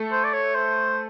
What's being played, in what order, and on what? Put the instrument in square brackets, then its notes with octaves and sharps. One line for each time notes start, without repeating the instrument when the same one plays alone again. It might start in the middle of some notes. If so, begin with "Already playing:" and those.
Already playing: [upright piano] A3 A4
[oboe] C5
D5
C#5
C5